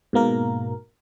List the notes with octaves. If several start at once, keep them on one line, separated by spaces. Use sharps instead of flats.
G#2 B2 A#3 A#4